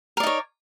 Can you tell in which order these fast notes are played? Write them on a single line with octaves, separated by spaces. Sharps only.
A#4 D5 D#4 C#5